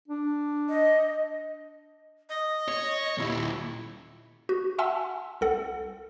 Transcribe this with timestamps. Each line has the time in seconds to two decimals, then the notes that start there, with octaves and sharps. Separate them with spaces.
0.08 D4
0.69 D#5
2.29 D#5
2.68 C#5
3.18 D#2 A#2 E4
4.49 F#4
4.78 E5 F#5 G#5 A5 C6 E6
5.41 C2 A4 F#5